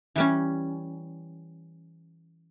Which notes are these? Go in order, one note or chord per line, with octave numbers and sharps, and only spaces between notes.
E3 G3 C#4